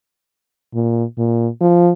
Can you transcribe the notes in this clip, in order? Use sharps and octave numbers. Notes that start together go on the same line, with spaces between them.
A#2
A#2
F3